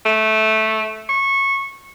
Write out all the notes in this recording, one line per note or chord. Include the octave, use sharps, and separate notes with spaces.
A3
C#6